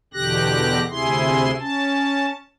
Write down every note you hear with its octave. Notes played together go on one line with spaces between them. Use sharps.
E2 B2 D3 G4 F#6 A#6
D2 C3 E4 G#4 C6
C#4 A5